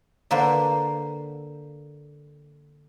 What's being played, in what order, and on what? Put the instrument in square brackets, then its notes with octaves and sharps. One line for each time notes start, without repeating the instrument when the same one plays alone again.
[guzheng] D3 A#3 B4 C5